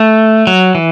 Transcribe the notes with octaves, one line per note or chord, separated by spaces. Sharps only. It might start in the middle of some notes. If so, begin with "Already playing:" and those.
Already playing: A3
F#3
E3